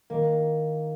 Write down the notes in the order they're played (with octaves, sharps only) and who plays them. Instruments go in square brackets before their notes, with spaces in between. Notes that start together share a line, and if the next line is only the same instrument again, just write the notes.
[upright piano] D#3 [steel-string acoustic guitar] A#3